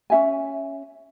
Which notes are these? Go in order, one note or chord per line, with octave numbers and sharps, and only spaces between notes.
C#4 F#4 E5 G#5